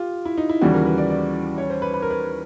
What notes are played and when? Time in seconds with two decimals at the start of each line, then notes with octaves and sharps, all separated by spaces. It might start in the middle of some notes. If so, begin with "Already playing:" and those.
Already playing: F4 G4
0.25 E4
0.38 D#4
0.49 E4
0.61 D#2 C#3 E3 G3 F#4
0.74 A#4
0.86 B4
0.98 D5
1.10 D5
1.58 C#5
1.70 C5
1.82 B4
1.94 B4
2.02 A#4
2.11 B4